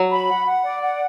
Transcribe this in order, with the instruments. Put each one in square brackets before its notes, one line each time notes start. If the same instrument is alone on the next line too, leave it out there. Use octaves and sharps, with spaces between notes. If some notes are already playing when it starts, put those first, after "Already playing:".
Already playing: [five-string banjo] F#3
[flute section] B5
F#5
F#5
D5
F#5